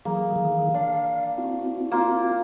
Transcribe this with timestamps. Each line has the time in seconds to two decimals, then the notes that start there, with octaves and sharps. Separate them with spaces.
0.05 E3 F#3 A#3 G#4
0.36 D#3 E3 G#4
0.74 D4 F5
1.38 C4 E4 F#4
1.92 A#3 F4